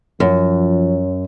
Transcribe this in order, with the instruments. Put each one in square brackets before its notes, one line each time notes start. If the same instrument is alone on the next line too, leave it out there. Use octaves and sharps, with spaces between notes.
[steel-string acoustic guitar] F#2 [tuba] F3